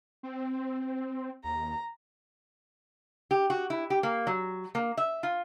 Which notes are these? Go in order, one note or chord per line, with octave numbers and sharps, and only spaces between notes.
C4
D#2 A#5
G4
F#4
E4
G4
A#3
F#3
A#3
E5
F4